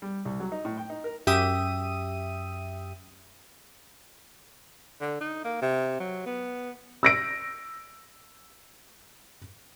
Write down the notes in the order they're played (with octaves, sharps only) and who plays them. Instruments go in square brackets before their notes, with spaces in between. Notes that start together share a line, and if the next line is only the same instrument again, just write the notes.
[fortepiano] G3
C2
F#3
D#4
A2
G5
D#4
A#4
[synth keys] F#2 G4 E5 D#6 D#7
[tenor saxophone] D3
D#4
A#3
C3
F#3
B3
[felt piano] E6 A#6 D7